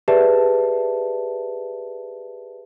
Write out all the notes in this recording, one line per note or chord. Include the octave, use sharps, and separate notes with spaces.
G4 G#4 B4 D5 E5 A5